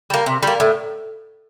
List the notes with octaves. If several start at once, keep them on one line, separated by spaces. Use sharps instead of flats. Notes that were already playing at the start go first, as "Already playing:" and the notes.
G3 A#3
C3
G3 A#3
A2